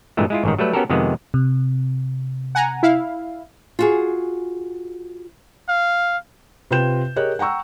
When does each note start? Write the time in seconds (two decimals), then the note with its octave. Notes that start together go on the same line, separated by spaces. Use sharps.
0.17 G2 A#2 E3 G#3 A3
0.30 G#3 E4 F4
0.44 A1 G#2 D#3
0.58 F#3 G3 A3 B4
0.73 B3 C#4 F#4 G4 A4 A#4
0.90 F2 C3 D#3 G#3 B3
1.34 C3
2.55 F#5 G#5 A#5
2.83 E4 F5
3.79 F4 F#4 G#4
5.69 F5
6.71 C3 F4 B4 G5 G6 E7
7.16 G4 G#4 A#4 C#5 D#5 F#6
7.39 F#5 G5 A#5 C#6 E6